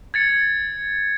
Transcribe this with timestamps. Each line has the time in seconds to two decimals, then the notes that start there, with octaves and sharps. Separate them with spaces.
0.14 G#6 A6 C#7